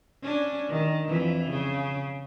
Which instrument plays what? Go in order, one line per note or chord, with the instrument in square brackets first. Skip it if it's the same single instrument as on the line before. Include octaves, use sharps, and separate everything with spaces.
[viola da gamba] C#4 D4
D#3
F2 E3
C#3